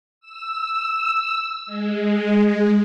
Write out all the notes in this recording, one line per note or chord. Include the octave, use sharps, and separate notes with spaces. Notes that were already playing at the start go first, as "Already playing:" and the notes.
E6
G#3